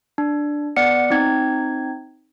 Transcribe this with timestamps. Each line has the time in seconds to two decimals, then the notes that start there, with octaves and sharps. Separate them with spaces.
0.18 D4
0.77 B3 D5 F#5 C#7
1.10 C4 D#4 G#6